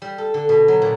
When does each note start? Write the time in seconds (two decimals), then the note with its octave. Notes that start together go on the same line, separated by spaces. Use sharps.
0.02 G3
0.18 A4
0.34 D3
0.49 B2
0.68 F#3
0.82 A#2